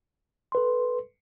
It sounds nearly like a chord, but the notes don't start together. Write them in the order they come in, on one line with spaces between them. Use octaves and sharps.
C6 B4 A4